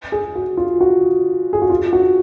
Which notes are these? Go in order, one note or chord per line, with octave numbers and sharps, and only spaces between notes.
G#4
F#4
F4
F#4
G#4
F#4
F4
F#4